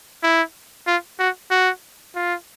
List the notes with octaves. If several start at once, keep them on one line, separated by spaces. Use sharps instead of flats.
E4
F4
F#4
F#4
F4